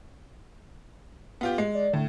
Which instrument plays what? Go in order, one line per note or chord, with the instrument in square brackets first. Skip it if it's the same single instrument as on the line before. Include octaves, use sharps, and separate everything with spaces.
[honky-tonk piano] B3 F4 G4
G#3
[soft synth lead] D5
[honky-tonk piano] A2 [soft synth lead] D3